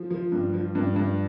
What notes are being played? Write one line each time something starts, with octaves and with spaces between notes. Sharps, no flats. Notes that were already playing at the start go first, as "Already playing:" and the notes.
Already playing: F3
F3
G2
F3
G2
G2